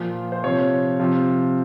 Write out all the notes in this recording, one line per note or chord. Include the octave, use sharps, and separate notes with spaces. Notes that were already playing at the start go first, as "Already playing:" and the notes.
Already playing: A#2 F3
C5
C3 F3 C#5
C3 F3